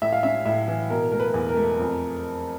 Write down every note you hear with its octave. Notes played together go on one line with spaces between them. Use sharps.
A2 E5
F5
C#4 E5
A2 E5
E3
B2 A#4
A3 A#4
B4
E2
A#4
A3
F2